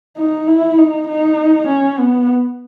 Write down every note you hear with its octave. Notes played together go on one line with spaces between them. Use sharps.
D#4
E4
D#4
D#4
C#4
B3